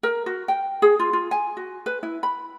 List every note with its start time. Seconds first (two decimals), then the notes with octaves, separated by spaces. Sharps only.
0.03 A#4
0.26 F#4
0.48 G5
0.82 G#4
0.99 F4
1.13 F4
1.31 G#5
1.57 F#4
1.86 B4
2.03 E4
2.23 B5